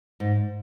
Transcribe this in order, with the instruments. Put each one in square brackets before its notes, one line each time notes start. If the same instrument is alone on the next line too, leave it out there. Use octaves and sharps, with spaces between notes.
[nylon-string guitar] G#2